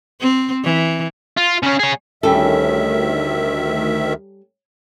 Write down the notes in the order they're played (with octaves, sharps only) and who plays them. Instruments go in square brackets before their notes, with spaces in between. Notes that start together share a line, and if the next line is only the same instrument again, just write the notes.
[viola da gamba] C4
E3
[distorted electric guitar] F4
C#3 C#4
G#4 C#5
[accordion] D2 D#3 E5 [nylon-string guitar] G3 C#4 A4